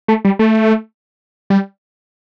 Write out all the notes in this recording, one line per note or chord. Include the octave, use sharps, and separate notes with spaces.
A3
G3
A3
G3